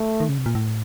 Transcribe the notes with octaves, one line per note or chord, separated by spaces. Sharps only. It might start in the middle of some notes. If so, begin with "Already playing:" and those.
Already playing: A3
D#3
C#3
C3
A#2
A2